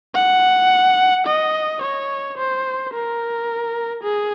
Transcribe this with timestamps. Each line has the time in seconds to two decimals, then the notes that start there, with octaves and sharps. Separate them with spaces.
0.15 F#5
1.26 D#5
1.82 C#5
2.37 C5
2.93 A#4
4.03 G#4